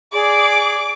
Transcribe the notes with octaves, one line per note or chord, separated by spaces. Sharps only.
G#4 D5 D6